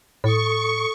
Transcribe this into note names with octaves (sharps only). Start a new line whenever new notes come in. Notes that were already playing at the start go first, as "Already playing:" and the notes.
A2 A4 C#6 D#6